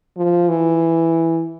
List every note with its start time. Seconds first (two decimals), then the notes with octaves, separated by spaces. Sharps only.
0.17 F3
0.49 E3